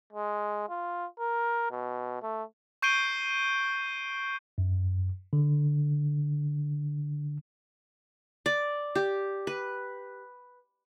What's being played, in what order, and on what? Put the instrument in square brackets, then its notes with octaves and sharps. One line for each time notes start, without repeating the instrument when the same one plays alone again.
[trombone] G#3
F4
A#4
B2
A3
[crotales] C#6 G6 C7 D7 D#7 G7
[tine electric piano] F#2
D3
[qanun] D5
G4
B4